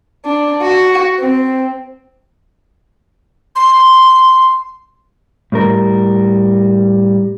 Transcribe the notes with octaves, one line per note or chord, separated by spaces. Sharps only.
D4
F#4
C4
C6
A2 G3 A#4